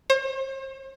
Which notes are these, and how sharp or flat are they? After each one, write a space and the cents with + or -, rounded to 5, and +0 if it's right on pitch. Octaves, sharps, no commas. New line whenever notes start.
C5 +40